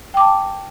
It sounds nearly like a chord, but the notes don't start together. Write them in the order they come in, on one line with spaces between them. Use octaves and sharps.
G5 D6 A5